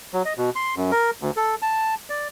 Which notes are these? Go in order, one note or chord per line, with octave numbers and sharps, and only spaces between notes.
F#3
D#5
B2
C6
F#2
A#4
D2
A4
A5
D5